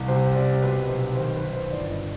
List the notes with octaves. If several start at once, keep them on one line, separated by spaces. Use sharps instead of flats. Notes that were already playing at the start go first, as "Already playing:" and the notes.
Already playing: C2
C3 C5
C3 D5
B2 B4
B1 C5
D#3 C5
B4
D#3
C5
G1 D5
D#5